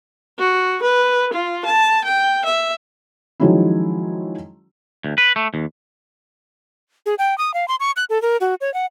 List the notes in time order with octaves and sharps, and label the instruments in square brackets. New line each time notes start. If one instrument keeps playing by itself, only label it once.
[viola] F#4
B4
F4
A5
G5
E5
[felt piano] D#3 F3 F#3 G#3 C#4 E4
[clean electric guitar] D2
B4
A3
D#2
[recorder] G#4
G5
D#6
F5
C6
C#6
F#6
A4
A#4
F#4
C#5
F#5